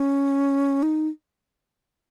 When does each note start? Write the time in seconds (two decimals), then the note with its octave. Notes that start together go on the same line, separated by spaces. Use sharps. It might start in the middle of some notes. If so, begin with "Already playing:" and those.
Already playing: C#4
0.83 D#4